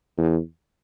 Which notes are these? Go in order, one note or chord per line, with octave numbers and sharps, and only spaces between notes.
E2